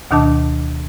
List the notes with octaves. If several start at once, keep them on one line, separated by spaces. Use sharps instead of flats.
D2 B2 D#3 D4 D#5 A5